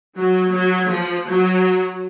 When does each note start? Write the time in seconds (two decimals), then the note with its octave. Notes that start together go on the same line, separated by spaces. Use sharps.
0.17 F#3
0.54 F#3
0.92 F3
1.28 F#3